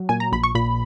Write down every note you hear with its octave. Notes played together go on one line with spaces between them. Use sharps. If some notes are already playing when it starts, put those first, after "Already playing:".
Already playing: F#3
A#2 G#5
A#5
A#1 B5
C#6
A#2 B5